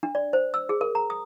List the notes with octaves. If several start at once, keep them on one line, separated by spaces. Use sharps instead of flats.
D4
D5
C5
E6
G#4
A#4
A#5
D#6